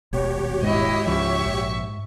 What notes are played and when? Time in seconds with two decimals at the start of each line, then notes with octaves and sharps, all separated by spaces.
0.13 D#1 G#1 B2 F#4 G4 C#5
0.63 G#2 E4 D#5
1.07 C#2 C#3 F3 E5 C#6
1.45 A#1